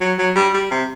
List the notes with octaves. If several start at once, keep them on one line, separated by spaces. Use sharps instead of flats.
F#3
F#3
G3
G3
C3